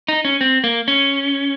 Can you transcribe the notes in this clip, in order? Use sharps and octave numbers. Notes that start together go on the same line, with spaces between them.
D#4
C#4
C4
A#3
C#4